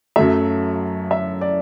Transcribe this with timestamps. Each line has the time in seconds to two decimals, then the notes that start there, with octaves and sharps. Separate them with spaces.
0.16 F#2 F#3 A3 E5
1.11 E5
1.41 D5